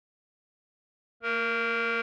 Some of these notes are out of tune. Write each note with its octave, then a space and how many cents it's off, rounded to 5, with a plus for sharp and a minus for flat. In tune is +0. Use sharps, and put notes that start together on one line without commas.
A#3 -40 A#4 +0